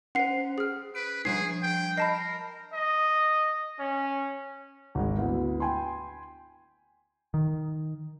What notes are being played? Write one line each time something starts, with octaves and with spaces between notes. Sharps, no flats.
C#4 C5 F#5 C7
G#4 F6
B4 D7
F3 G3 D4 G#4 C7
G5
A#4 D#5 A5 B5 C7
D#5
C#4
G#1 G#3
D2 B3 E4
G5 G#5 B5 C6
D#3